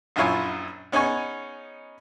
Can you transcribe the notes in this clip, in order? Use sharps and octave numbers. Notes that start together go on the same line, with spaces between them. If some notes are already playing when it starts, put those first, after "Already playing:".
A#1 F#2 E4 F4 C#5 G#5
B3 C#4 D#4 G#4 G#5 C#6